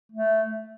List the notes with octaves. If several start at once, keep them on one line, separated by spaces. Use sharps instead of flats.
A3